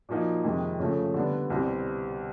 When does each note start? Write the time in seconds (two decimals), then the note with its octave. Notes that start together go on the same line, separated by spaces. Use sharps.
0.09 A#2 F3 A#3 D#4 F#4
0.44 F2 C3 D#3 G#3
0.80 C#3 F3 A3
1.14 D3 G3 B3 D4
1.50 C2 B2 G3 C4